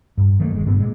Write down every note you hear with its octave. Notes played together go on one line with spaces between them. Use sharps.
G2
D#3 F#3 A3 A#3
F1 G#3
G2 A#2 B3
A#2 G#3